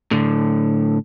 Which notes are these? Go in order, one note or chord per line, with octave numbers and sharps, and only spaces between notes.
A2 D3